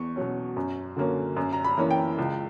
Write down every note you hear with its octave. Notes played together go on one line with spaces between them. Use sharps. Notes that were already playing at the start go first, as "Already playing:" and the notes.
Already playing: E2 C#6
B2 F#3 C#4
F#2
D3 F#3 A#3 C#4
F#2
A#5
B5
E3 A#3 C#4
G5
C#2